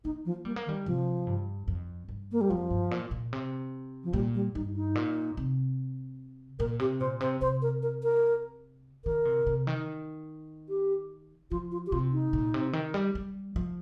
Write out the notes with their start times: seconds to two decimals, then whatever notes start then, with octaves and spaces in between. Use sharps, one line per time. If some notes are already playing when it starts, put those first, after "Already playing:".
0.04 A#3 D#4
0.25 F3
0.45 G3 A#3
0.56 A#3
0.66 D#3
0.69 G3
0.86 C3 F3
1.27 G2
1.68 F2
2.09 G2
2.32 A#3
2.41 G3
2.50 F2 F3
2.70 G2
2.91 A#2
3.11 A#2
3.33 C3
4.04 F3
4.13 A#2 G3
4.34 G3
4.55 G2 D#4
4.76 D#4
4.95 A#2
5.37 C3
6.59 A#2 A#4
6.79 C3 G4
7.00 A#2 C5
7.20 C3 C5
7.41 C3 C5
7.62 A#4
7.82 A#4
8.03 A#4
9.05 D#3 A#4
9.25 C3
9.47 C3
9.67 D#3
10.69 G4
11.51 F3 F4
11.72 F4
11.87 G4
11.92 C3 F4
12.12 D#4
12.33 A#2
12.54 C3
12.73 D#3
12.94 G3
13.15 G3
13.56 F3